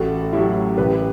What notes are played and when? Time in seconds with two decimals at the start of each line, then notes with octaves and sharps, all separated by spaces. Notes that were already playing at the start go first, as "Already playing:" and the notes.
Already playing: A1 F#4 A4
0.32 A2 F#3 E4 G4
0.78 A1 G4 B4